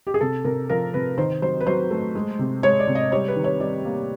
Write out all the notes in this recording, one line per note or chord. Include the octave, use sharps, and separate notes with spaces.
G4
G#4
C3 A4
C3 A#4
F3 A#4
C3 B4
D#3 C5
F#3 C5
B4
F#3 C5
A3
G#3
C3
G#3 C#5
D5
C3
D#5
G3 C#5
B4
D#3
C#5
G3 D5
A#3